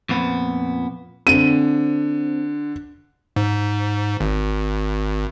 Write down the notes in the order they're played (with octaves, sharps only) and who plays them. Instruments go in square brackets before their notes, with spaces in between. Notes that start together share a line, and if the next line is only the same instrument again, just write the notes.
[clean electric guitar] F2 A#2 B3
[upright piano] D3 [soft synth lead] C4 [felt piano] D#7
[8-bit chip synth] G#2
G#1